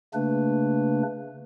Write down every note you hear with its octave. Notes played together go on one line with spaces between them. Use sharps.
C#3 A3 A#3 D4 B4